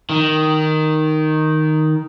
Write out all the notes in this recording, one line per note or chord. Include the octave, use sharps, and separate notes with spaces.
D#3